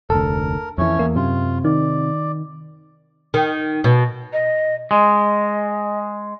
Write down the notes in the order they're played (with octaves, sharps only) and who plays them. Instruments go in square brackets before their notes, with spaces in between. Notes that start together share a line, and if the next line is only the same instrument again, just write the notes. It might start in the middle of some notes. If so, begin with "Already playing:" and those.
[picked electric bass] F1 D2 [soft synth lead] A4 [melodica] A#4
[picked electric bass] F2 E3 [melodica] A3 C#4 C#5
[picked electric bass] E2 [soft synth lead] A#3
[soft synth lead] F#2 [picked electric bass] C3 [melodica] F4
[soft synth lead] D#3 [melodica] D5
[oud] D#3
B2
[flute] D#5
[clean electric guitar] G#3 [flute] D#5